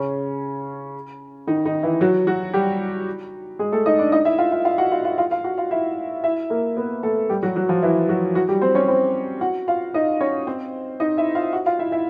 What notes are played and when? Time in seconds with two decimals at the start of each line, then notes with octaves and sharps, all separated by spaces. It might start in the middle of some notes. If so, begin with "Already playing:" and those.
Already playing: C#3 C#4
1.47 D#3 D#4
1.66 D#3 D#4
1.83 E3 E4
2.01 F#3 F#4
2.27 F#3 F#4
2.53 G3 G4
3.59 G#3 G#4
3.72 A3 A4
3.86 D#4 D#5
3.99 D4 D5
4.12 D#4 D#5
4.25 E4 E5
4.38 F4 F5
4.52 F4 F5
4.65 F4 F5
4.78 F#4 F#5
4.92 F4 F5
5.05 F4 F5
5.18 F4 F5
5.31 F4 F5
5.44 F#4 F#5
5.58 F4 F5
5.71 E4 E5
6.24 E4 E5
6.50 A#3 A#4
6.77 B3 B4
7.03 A3 A4
7.30 G3 G4
7.43 F#3 F#4
7.56 F#3 F#4
7.69 F3 F4
7.82 E3 E4
8.09 F#3 F#4
8.35 F#3 F#4
8.48 G3 G4
8.61 C4 C5
8.75 C#4 C#5
8.88 C4 C5
9.41 F#4 F#5
9.68 F4 F5
9.94 D#4 D#5
10.21 C#4 C#5
10.47 C4 C5
11.00 D#4 D#5
11.17 E4 E5
11.35 F4 F5
11.53 F#4 F#5
11.66 F4 F5
11.79 E4 E5
11.92 E4 E5